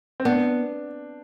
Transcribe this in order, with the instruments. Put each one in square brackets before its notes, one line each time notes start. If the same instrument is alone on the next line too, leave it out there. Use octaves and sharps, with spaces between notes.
[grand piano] C4
[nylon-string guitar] B3 [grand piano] D4